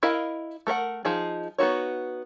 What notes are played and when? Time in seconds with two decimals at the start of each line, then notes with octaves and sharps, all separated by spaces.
0.03 E4 A#4 D#5 F5
0.67 A3 A#4 C5 F#5
1.05 F3 D#4 G#4
1.58 B3 D#4 F#4 C#5